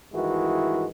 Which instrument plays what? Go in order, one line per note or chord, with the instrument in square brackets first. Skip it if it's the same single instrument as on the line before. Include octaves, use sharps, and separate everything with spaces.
[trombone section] G2 D#3 E3 G#3 E4 F#4